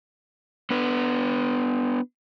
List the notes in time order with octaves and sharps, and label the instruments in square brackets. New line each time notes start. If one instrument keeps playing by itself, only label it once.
[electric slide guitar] B3 D4 B4